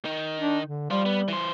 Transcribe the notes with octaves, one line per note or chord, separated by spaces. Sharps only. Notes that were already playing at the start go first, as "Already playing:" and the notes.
D#3 D#4
D4
D3
G3 F4 C5
B3
E3 C5